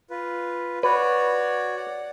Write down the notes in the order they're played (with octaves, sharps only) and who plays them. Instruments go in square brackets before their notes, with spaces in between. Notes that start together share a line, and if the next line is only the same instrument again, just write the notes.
[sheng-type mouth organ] F4 B4
[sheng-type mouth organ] F#4 C#5 D5 [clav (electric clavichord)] B4
[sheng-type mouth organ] D5 F#5